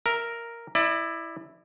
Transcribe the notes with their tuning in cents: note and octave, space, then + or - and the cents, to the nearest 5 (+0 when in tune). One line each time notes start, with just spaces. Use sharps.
A#4 +0 E5 +0
E4 +0 D5 +35